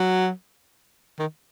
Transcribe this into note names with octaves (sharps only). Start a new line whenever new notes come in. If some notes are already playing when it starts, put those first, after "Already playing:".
Already playing: F#3
D#3